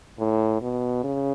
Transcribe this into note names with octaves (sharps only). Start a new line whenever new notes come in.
A2
B2
C#3